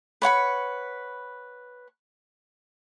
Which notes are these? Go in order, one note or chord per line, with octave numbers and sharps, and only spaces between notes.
B4 C#5 F#5 B5